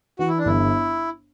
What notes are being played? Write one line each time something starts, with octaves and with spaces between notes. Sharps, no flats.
E3 F#4
E4
D4
G1 E4